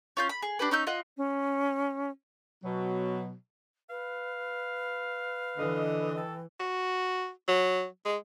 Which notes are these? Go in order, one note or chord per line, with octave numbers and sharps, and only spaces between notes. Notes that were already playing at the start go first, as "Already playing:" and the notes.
C#4 F4 G6
B5
G#4
D4 G4 B4
C#4 D#4 E6 G6
F4 D#5 F#5
C#4
B2 F#3
B4 F5
D3 E3 D#5
A4 G5
F#4
F#3
G#3